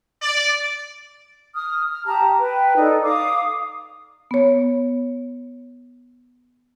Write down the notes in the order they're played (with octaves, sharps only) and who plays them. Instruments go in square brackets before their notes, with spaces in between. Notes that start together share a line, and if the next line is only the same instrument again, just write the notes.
[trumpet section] D5
[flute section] D#6 F6
F6
G4 A5 A#5
B4 G5
D#4 A4 D5
F5 D6 D#6
[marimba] B3 C#5